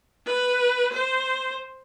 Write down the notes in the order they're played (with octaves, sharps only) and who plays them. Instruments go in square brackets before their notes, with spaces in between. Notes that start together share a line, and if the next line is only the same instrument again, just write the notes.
[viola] B4
C5